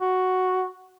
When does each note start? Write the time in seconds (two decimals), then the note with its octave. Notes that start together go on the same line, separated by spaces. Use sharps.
0.01 F#4